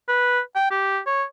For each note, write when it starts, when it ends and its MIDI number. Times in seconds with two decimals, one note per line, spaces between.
0.08 0.40 71
0.55 0.70 79
0.71 0.99 67
1.07 1.23 73